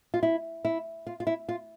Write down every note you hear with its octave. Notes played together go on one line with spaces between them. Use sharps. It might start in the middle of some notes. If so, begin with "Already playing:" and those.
F4
E4
E4
F4
F4
E4
F4